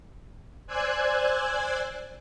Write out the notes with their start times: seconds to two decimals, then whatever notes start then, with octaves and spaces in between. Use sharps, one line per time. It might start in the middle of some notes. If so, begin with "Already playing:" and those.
0.67 C5 D5 G#5 E6 F#6 G#6